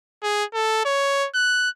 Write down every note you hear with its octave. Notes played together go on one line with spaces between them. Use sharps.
G#4
A4
C#5
F#6